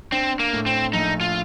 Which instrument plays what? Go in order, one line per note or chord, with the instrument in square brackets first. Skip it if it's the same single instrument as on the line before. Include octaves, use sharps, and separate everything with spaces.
[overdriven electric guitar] C4 [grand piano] D4
[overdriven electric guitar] A#3
[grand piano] A2
[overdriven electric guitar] C4
[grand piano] A#1 [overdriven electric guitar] D#4
[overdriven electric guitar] F4